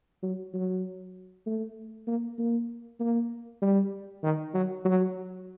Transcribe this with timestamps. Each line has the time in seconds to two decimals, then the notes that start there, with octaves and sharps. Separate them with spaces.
0.23 F#3
0.54 F#3
1.46 A3
2.07 A#3
2.39 A#3
3.00 A#3
3.62 G3
4.23 D#3
4.54 F#3
4.85 F#3